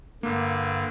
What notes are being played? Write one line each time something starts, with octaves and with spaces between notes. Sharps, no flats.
G2 D3 A#3